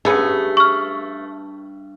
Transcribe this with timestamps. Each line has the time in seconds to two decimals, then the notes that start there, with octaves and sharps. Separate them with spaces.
0.05 G2 A3 B3 C#4 G#4
0.57 C#6 F6